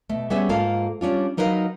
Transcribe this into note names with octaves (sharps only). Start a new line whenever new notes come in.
B2 A3
G3 B3 C#4 G#4 E5
G#2 A#3 F4 A4 F5
G3 C#4 D4 F4
F#3 D#4 A#4 B4 C#5 F5